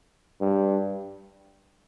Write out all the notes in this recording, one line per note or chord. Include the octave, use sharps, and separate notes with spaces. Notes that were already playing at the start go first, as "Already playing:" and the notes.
G2